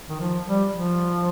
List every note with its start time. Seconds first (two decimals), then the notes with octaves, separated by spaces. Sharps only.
0.09 D#3
0.20 F3
0.46 G3
0.72 F3